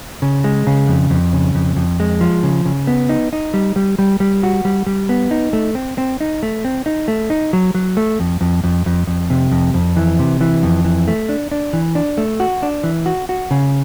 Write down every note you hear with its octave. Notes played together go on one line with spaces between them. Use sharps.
C#3
G#3
C#3
F2
F2
C#3
F2
F2
G#3
F3
C#3
C#3
B3
D#4
D#4
G3
G3
G3
G3
F#4
G3
G3
B3
D#4
A3
C4
C4
D#4
A3
C4
D#4
A3
D#4
F#3
F#3
A3
F2
F2
F2
F2
F2
C3
F2
F2
E3
C3
E3
F2
E3
A3
D4
D4
E3
D4
A3
F#4
D4
E3
F#4
F#4
C#3